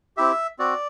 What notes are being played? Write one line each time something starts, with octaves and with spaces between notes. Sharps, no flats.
C4 E4 G4 E5
C4 F#4 D5